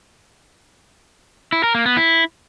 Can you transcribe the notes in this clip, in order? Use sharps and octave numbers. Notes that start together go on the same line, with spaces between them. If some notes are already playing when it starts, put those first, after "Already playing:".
E4
A#4
A#3
B3
E4